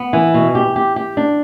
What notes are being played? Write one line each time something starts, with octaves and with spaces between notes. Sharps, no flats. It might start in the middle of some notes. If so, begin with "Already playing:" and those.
Already playing: B3
E3
B2
G4
G4
G4
D4